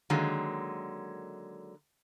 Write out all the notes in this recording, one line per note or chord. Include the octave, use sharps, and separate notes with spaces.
D3 D#3 F#3 G#3 A#3